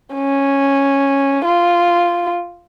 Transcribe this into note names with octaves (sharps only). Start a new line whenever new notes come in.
C#4
F4